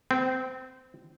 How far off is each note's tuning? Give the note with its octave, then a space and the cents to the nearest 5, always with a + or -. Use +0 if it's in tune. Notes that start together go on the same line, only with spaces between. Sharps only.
C4 -20